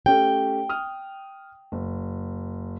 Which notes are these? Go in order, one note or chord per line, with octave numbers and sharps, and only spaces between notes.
A3 C#4 G4 G5
D#6 F6
F#1